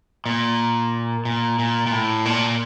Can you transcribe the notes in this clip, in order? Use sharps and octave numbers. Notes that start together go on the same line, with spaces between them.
A#2
A#2
A#2
A#2
A2
A#2